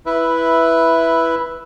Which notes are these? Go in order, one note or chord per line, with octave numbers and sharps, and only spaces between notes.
E4 B4 E5